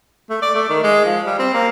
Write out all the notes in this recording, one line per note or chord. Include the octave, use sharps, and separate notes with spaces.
A3
D5
A3
D#3
G#3
F3
G3
C4
A#3